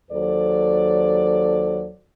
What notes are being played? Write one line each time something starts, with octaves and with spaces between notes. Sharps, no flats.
D#2 F#3 A4 C5 D5